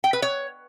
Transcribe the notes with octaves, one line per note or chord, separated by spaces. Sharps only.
G5
B4
C#5